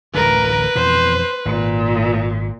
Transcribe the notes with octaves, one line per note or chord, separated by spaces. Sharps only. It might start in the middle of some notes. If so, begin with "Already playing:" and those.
D1 A1 D3 A#4 B4
F2 B2 E3 C5
G#1 A#2